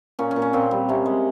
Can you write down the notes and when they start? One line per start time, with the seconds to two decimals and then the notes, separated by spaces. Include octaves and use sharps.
0.19 A#2 C#4
0.31 C#4
0.36 A#2
0.42 C#4
0.53 A#2 C4
0.71 G3
0.89 C3 C#4
1.06 G#3